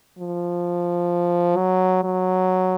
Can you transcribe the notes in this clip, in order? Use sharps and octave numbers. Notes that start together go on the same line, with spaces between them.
F3
F#3
F#3